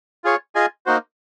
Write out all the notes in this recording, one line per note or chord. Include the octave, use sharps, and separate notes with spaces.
F4 G#4 C#5
F4 G#4 D#5 G#5
A#3 D#4 F#4 C5